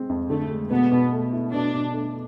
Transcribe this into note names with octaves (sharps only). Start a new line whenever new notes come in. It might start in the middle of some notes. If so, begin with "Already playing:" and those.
Already playing: G#3 C4
F2
D3 A3
G#3
B2 B3
B2
A3
E4
B2 D4
B2
A3